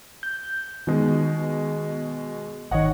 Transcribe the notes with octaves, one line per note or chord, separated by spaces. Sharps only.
G6
B2 D#3 G#3 B3
G#1 D#3 C#5 D#5 F#5